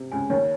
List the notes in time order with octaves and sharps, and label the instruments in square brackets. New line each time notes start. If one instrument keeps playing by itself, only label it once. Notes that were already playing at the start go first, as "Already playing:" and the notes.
Already playing: [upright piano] C3
[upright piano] C#2 C#3 [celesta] G#5
[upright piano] D#2 D#3 [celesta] C#5